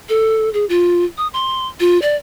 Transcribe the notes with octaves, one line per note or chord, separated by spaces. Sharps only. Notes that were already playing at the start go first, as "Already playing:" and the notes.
A4
G#4
F4
D#6
C6
F4
D5